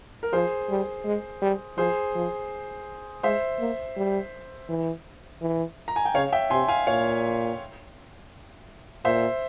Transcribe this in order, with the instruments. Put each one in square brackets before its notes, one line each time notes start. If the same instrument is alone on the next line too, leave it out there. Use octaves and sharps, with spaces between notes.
[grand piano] A#4
[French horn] F3 [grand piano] G#4 C5
[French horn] G3
G#3
G3
[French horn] F3 [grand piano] G#4 C5
[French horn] F3
[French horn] G#3 [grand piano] C5 E5
[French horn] A#3
G3
E3
E3
[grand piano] A#5
G#5
G5
[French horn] C#3 [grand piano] C#5 F5
[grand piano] E5 G5
[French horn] C3 [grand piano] G#5 C6
[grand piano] F5 G#5
[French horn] A#2 [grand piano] C#5 F5
[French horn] A#2 [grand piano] C5 E5